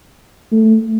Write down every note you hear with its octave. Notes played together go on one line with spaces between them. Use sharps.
A3